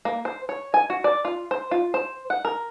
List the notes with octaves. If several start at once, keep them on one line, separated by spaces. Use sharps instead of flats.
A#3
C5
C#5
G#5
F#4
D5
F4
C5
F4
C5
F#5
A#4